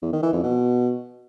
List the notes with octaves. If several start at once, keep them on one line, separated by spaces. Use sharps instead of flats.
E2
D#3
E3
F2
B2